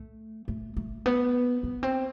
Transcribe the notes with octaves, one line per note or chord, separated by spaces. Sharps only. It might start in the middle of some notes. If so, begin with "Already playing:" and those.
Already playing: A3
A3
A3
B3
B3
C4